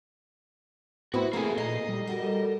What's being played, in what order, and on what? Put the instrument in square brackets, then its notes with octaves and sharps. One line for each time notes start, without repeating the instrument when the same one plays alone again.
[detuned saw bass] A2 [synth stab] B3 C4 E4 [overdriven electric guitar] F#4 [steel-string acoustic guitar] B4
[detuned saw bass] C3 [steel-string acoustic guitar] A3 A4 [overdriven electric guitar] A#3 G#4
[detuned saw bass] A#2 [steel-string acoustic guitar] D#4 [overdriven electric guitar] D#5 [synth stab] A#5 C7
[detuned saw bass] G3
[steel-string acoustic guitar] F#4 A4 A#4